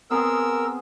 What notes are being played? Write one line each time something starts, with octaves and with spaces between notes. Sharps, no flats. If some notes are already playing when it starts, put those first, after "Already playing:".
B3 C4 G#4 A#4 E6